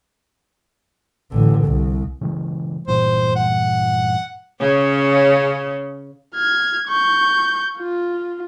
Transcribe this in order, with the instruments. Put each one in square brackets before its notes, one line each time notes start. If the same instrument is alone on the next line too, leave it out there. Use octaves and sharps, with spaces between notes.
[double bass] A1 D3
C2
[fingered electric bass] C#3 E3 G#3
[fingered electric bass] G2 A#2 E3 [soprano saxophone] C5
[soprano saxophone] F#5
[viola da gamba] C#3 C#4
[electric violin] F6 G#6
C#6 G6
F4